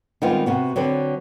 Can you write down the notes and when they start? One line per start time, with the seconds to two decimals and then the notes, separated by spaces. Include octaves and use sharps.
0.22 D#3 G3 G#3 B3 C4 F4
0.46 C3 B3 F#4
0.76 D3 F#3 C4 B4